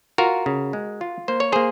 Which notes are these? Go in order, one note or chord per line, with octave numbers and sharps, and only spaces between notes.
F4 F#4 A#4
C#3
G#3
F4
A#3 C5
C#5
A#3 G#4 C5